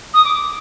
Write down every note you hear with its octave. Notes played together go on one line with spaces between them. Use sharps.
D#6
D6